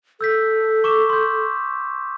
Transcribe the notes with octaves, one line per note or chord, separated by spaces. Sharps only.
A4 E6 G6 B6
C#6 D6 E7
C6 G6